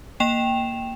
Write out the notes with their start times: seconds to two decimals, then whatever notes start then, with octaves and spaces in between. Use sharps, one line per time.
0.20 A#3 G5 E7 F7